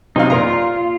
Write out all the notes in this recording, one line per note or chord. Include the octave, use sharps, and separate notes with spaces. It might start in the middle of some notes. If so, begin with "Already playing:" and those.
C3 F#3 C4 D#4 F5
A#2 F4 A#4 A#5